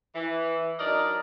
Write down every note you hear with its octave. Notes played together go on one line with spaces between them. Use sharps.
E3
F#3 D4 D#4 A#4 D5 D#5